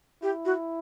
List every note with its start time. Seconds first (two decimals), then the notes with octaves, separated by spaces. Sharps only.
0.23 E4 G4
0.45 F#4